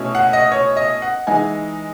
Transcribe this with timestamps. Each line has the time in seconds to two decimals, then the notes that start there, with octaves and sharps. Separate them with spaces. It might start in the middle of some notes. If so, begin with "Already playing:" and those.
Already playing: B2 A3 C#4 E4
0.15 F#5
0.33 D#5
0.52 C#5
0.77 D#5
1.02 F#5
1.27 E3 G#3 D#4 G#5